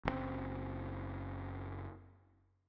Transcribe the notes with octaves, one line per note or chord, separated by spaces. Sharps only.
F#1 C3 C4